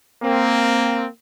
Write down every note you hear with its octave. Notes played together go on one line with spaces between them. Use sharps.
A#3 C4